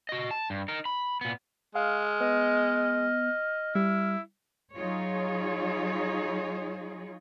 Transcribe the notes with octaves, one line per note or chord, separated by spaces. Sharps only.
F#4 D#5
A5
G2
D#4 A#4
B5
A#2 B3
G#3 F5 F6
B3 D#5
G3 E4
F#3 D#4 F4 G#4 C#5